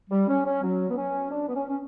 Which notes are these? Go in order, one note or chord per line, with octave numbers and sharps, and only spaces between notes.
G3
C#4
C#4
F#3
B3
C#4
D4
B3
C#4
C#4